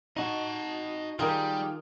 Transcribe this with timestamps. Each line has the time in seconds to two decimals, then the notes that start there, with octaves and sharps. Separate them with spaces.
0.17 D#4 F#4 D#5 A5
1.19 D#3 G3 F4 G4 G#4 A#4